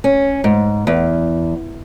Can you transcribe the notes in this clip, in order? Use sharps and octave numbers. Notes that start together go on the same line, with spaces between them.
C#4
G#2
E2